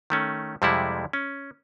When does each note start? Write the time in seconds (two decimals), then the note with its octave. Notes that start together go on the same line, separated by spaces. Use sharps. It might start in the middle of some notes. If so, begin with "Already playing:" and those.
0.10 D#3 A3 C#4
0.62 F2 C3 G3 G#3 E4 F#5
1.13 C#4